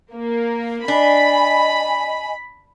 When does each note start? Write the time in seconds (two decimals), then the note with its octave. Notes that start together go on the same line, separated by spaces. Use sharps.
0.14 A#3
0.88 D4 D#5 G#5 B5